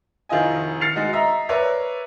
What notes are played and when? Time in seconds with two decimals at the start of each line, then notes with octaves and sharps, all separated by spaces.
0.29 F1 D#3 E4 F4 D#5 G#5
0.81 F6 A6 C7 C#7 F7
0.95 G#3 D#4 F#4
1.13 D#5 E5 A#5
1.49 A#4 B4 C#5 D5 E5